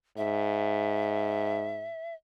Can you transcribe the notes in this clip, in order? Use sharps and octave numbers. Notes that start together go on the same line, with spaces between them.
G#2 E5